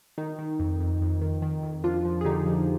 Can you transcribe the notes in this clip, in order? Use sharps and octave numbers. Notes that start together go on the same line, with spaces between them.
D#3 D#4
D#3
F2
F2
F2
D#3
D#3
F2
F3 D4 F4
F3
G#4
D3 D#4 G4
F3